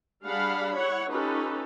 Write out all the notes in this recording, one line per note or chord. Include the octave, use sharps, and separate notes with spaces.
G3 D4 G#4 F5 F#5 B5
E4 C#5 F#5
C#4 D#4 F4 G4 A4 B4